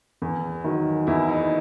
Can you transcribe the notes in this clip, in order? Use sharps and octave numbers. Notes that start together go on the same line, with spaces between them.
E2
D#3 F#3
E2 E4
D#4